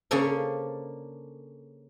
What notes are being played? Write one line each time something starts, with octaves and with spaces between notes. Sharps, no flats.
C#3 A#3 C#4 D4 A4 C5